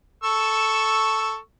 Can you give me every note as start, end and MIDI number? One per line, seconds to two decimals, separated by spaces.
0.24 1.38 69
0.24 1.38 85
0.24 1.38 88